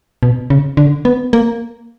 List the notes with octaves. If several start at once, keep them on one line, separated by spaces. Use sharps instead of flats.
B2
C#3
D3
B3
A#3